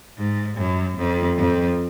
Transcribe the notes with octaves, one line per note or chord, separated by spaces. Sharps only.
G#2
F#2
F2
F2